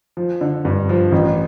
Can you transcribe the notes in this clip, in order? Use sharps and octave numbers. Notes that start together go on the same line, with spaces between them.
F3
D3
G2
F3
A1